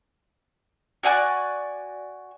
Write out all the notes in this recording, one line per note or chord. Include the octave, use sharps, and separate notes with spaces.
F#4 D5 G#5 F#6